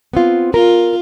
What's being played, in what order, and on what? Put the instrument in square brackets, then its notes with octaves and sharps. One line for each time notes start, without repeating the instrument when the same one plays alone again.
[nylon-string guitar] B3 C4 F4
[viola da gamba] F4 [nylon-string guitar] A#4